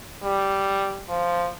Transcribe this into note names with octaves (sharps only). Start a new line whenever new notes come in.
G3
F3